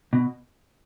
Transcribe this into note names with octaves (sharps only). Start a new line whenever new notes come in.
B2